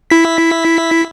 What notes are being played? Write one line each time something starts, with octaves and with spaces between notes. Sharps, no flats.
E4 B6